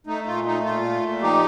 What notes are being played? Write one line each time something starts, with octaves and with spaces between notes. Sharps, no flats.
A3 D#4
A#2 F4
A3 D#4
A#2 F4
A3
A#2
F3 D#4 G4